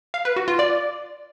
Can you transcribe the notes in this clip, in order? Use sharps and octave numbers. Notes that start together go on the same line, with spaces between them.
F5
B4
F#4
F4
D5